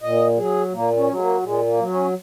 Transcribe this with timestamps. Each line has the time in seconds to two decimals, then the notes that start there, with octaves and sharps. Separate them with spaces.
0.02 A#2 D#5
0.38 F#3 G#4
0.73 A#2 A#3
0.97 C#4
1.09 F#3
1.14 G#3
1.20 A#3
1.44 A#2 G#3
1.67 A#3
1.79 F#3
1.90 C#4